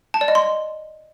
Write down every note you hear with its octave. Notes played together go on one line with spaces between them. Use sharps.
A5
D5
D#5
C6